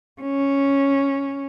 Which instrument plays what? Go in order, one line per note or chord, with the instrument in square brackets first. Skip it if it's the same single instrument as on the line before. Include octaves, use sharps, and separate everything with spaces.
[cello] C#4